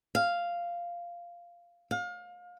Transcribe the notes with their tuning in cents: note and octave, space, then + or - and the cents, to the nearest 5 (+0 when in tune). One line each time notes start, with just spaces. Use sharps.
F5 -5
F5 +30